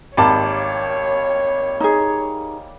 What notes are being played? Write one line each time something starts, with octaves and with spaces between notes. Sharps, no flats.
G#1 G3 A#3 C#5 A5
D#4 G#4